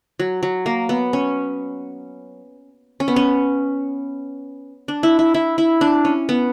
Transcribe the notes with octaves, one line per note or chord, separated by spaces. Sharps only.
F#3
F#3
A#3
B3
C#4
C#4
B3
C#4
D4
E4
E4
E4
E4
D4
C#4
B3